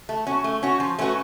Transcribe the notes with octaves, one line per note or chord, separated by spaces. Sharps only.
A3
C#4 F#4
A3
C#4 F#4
F3
A3 C#4 F#4 B4